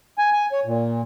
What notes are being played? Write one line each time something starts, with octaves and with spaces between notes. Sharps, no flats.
G#5
G#5
C#5
A#2